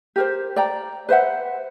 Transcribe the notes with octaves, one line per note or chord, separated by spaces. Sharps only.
G4 A#4 C5
D5 G5 A#5
B4 C5 E5 F#5